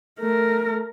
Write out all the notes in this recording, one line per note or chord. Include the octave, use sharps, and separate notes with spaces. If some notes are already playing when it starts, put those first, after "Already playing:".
A3 A#4